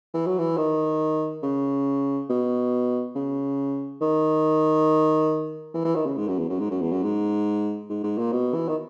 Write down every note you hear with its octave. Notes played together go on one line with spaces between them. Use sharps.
E3
F#3
E3
D#3
C#3
B2
C#3
D#3
E3
E3
D#3
C#3
G#2
F#2
E2
F#2
G#2
F#2
E2
F#2
G#2
G#2
G#2
A#2
B2
E3
D#3